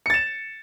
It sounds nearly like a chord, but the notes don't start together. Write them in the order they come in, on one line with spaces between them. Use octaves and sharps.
C#7 A6 E7